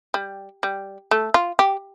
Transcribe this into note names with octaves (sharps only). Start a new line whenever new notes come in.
G3
G3
A3
F4
G4